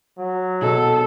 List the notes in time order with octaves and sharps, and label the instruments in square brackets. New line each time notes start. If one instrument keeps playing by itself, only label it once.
[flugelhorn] F#3
[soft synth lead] B2 [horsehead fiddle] A4